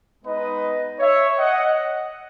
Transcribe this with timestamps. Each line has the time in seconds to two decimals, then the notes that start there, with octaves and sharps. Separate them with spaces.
0.23 G#3 B3 D#4 B4 D#5
0.99 C#5 E5
1.37 D#5 F#5